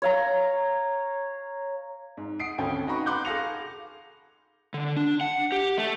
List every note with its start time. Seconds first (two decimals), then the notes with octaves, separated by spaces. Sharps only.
0.02 C#5 F5 A#5
2.17 G#2
2.40 F#5 D#6 C7 D7
2.58 G#1 D2 C#4 A4 G5
2.87 D#4 F#4 A#5 B5 C#6
3.06 F#5 B5 C6 D6 F#6 G6
3.25 G#4 A4 F5 A#6 C#7 F7
4.74 D3
4.97 D4
5.21 F#5
5.52 G4
5.77 A3